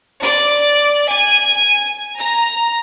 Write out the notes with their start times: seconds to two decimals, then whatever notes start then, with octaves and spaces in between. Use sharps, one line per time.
0.22 D5
1.09 G#5
2.18 A#5